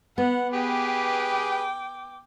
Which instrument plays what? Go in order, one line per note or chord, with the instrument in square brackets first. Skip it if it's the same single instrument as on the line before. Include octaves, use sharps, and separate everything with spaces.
[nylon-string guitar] B3 [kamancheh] F#5
[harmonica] G4 G#4 B4 [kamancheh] G5 D6